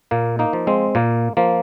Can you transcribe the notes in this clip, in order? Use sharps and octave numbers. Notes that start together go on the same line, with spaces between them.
A#2 A#3
A#3 D#4
F3
G#3 C4
A#2 A#3
F3 A#3